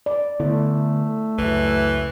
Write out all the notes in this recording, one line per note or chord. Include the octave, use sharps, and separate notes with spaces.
D5
D3 A3 B3 E4
C#2 F#2 E3